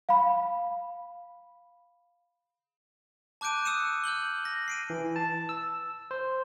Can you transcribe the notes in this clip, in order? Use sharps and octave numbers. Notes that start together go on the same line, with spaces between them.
F5 B5
A5 D6 F#6 G6 D7 D#7
D#6 E6 F#6 C#7 D#7 E7
F6 G6 F#7 G7
A#6
C7 D7 D#7
E3
A5
E6
C5